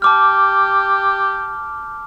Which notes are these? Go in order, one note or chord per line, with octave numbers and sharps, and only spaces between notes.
G4 A5 D6 F6